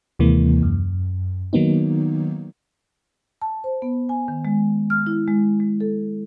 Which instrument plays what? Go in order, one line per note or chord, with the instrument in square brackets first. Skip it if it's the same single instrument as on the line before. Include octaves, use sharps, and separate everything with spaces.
[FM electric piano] D#2 C3 E3 G#3 A#3
F#2
D#3 F#3 A#3 B3 D#4
[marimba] A5
C5
B3
G#5
D#3
G#3
F6
E4
G#3
G#3
A4